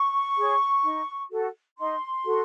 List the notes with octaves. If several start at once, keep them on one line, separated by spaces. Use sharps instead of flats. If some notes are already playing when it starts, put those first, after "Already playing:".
Already playing: C#6
G#4 C#5
D#4
F#4 A4
D#4 C6
F#4 A4